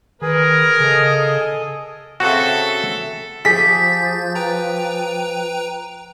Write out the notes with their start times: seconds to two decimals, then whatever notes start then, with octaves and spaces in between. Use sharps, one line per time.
0.22 D#3 G#4 A#4 B4
0.80 C#3 A4 D#5
2.20 C#3 C4 F#4 A4 E5
3.45 F3 G4 G#4 G6 A6 B6
4.35 B4 G5 A#5